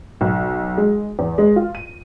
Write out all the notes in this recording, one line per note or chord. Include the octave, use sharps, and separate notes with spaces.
B1
G#3
E2
G#3
F4
D#7